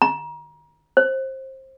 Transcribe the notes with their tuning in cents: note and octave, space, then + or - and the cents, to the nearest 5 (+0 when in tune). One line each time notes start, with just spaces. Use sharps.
A#5 +30
C5 +25